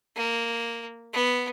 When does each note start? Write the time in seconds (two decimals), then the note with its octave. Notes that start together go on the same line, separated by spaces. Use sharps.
0.16 A#3
1.13 B3